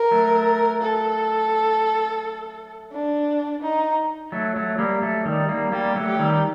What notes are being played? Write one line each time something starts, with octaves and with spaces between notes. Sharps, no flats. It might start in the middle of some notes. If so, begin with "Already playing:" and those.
Already playing: A#4
F#3 A3
A4
D4
D#4
F#3 A3
F#3 A3
G3 A#3
F#3 A3
D#3 G3
G3 A#3
G3 A#3 G4
F#3 A3
G4
D#3 G3